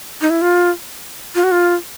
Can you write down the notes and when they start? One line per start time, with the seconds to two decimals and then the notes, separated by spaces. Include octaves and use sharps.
0.21 D#4
0.30 E4
0.42 F4
1.35 F4
1.44 F#4
1.52 F4